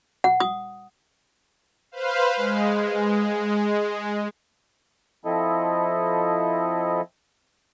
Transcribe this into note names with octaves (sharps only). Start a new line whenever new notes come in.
F#5
D#6
B4 C5 F5
G#3
F3 C4 E4 A4 D#5